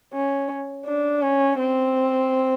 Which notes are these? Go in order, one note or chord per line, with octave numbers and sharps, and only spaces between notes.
C#4
D4
C#4
C4